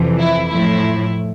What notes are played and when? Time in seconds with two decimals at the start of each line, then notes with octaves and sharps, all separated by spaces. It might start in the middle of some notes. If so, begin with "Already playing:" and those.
Already playing: F2 C3 E3
0.18 E4
0.50 A2 F3 A3 E4